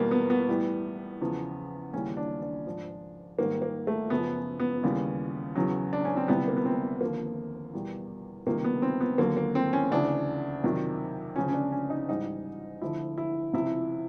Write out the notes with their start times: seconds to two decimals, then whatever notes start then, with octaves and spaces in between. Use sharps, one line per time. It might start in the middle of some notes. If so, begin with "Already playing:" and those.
Already playing: E2 B2 G3 A#3 B3
0.11 B3
0.30 B3
0.49 A2 E3 G3
1.21 E2 C#3 F3
1.93 D#2 C#3 E3 G3 C#4
2.17 D4
2.42 D4
2.66 G#2 F3
3.38 G#2 D#3 G3 A#3
3.62 A#3
3.87 A3
4.10 F#2 C#3 F3 B3
4.60 B3
4.83 D#2 C#3 E3 G3
5.55 E2 C#3 F#3
5.93 D4
6.05 C#4
6.17 C4
6.28 D2 C3 E3 G3 B3
6.48 A#3
6.57 B3
6.65 C4
7.01 D#2 D3 F3 A#3
7.74 E2 B2 G3
8.47 C#2 C3 D#3 G3 A#3
8.64 B3
8.82 C4
9.01 B3
9.18 D#2 D3 F#3 A#3
9.37 A#3
9.55 C4
9.73 C#4
9.91 D2 C#3 E3 D4
10.63 F2 C3 D#3 F#3
11.36 D2 C#3 F3 C#4
11.48 C#4
11.54 D4
11.72 C#4
11.90 D#4
12.09 G#2 E3 G3 D#4
12.81 D2 D3 F3 E4
13.18 E4
13.53 C#2 C3 F3 E4